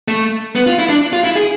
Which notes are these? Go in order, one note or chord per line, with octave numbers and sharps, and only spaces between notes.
A3
B3
F4
E4
D4
F4
E4
G#4